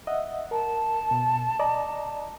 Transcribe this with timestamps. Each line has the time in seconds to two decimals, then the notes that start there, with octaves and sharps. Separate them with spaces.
0.07 D#5 E5 F#5
0.51 A#4 A5
1.11 B2
1.60 D5 D#5 A#5